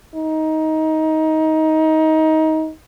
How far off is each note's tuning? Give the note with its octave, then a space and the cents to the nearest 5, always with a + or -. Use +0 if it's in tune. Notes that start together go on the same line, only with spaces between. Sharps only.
D#4 +20